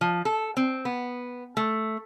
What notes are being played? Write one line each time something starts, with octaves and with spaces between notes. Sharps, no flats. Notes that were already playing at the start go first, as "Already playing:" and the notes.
F3
A4
C4
B3
A3